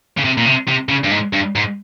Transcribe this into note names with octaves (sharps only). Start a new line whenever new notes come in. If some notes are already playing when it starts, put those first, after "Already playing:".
C#3
C3
A#2
C3
C3
C#3
G2
G#2
G2
G#2